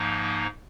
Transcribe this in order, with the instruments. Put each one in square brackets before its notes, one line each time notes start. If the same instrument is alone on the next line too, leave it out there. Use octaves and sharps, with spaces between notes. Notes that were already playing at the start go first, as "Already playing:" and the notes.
Already playing: [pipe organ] G#2 F3 A#3 D#4